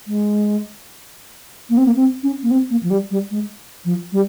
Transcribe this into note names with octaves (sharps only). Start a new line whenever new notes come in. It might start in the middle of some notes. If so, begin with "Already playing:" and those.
G#3
A#3
C4
A#3
C4
C#4
A#3
C4
A#3
F3
G3
G3
G#3
F3
G3